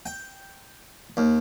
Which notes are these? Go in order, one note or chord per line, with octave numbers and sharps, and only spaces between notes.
G5
D#2